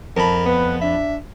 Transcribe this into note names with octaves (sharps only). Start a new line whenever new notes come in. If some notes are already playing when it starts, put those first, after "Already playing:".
F2 A#4 A5 B5
B3 B4
D4 E5